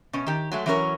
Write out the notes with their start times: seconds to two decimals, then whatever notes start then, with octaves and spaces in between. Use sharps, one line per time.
0.13 B2 C#4
0.26 D#3 G4
0.52 F#3 G#3 A3
0.66 E3 F#3 C#4 A4 A#4 C#5